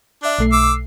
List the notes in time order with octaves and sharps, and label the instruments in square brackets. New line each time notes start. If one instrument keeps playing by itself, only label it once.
[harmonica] D4 [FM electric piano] E5 F#6
[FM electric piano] B1 A3 C7
[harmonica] D6 E6